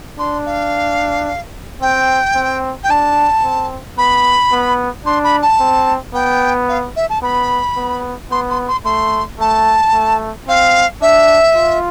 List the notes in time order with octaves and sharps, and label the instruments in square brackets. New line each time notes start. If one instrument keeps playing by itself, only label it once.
[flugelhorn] D4 [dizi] C6
[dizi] F5
[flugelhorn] C4 [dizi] G5
[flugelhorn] C4
[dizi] G5
[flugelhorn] D4 [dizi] A5
[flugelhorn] C4
[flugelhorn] B3 [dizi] B5
[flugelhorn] B3
[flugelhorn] D4 [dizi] C6
[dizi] B5
A5
[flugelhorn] C4
[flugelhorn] B3 [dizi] G5
[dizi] F5
E5
A5
[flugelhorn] B3 [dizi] B5
[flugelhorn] B3
[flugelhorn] B3 [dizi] C6
[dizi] C6
C6
[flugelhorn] A3 [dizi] C6
[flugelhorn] A3 [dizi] A5
[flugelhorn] A3
[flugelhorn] C4 [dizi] F5
[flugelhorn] D4 [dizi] E5
[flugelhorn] F4